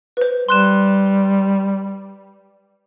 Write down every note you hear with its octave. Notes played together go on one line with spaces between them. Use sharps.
B4 C5
G3 C6 F#6 E7